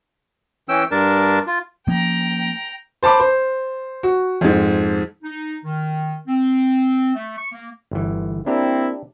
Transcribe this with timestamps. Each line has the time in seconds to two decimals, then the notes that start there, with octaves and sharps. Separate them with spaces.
0.69 E3 C#4 G5 E6
0.91 G2 D4 A#4 A5
1.47 F4
1.87 F3 A#3 C#4 G5 A#5
3.03 C5 A5 B5 D6
3.20 C5
4.03 F#4
4.41 F2 G#2
5.23 D#4
5.65 D#3
6.28 C4
7.15 A3
7.37 C#6
7.52 A#3
7.91 G1 E3
8.46 A#3 C4 D4 E4 G4 A#5